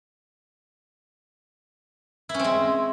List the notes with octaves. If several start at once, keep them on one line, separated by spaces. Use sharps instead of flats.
E4
C#4
C4
G#3